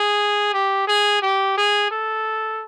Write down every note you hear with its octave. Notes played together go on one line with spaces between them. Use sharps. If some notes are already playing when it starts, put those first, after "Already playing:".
Already playing: G#4
G4
G#4
G4
G#4
A4